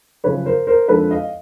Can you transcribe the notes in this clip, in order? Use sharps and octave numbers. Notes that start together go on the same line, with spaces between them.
F#2 C#3 F3 B4 C#5
A#4 C5
A#4 C5
F2 D3 F3 G#3 A4 B4
D#5 F5